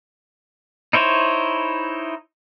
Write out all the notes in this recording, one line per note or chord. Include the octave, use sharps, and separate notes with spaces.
D#4 E4 C5 C#5